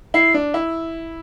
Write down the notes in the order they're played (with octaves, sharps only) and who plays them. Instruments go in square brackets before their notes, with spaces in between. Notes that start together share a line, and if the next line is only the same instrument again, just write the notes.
[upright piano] E4 [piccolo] C7
[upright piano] D4
E4